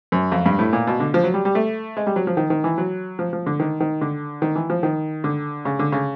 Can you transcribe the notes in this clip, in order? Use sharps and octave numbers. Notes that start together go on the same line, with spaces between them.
F#2
F2
G2
A2
A#2
B2
D3
F3
F#3
G3
G3
A3
G#3
G3
F#3
F3
D#3
D#3
E3
F#3
F3
F3
D3
D#3
D#3
D3
D#3
E3
F3
D#3
D3
C#3
D3
C#3